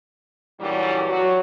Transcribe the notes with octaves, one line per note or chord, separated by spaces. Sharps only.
G2 A#2 C#3 E3 F#3 G3
F#3 F#4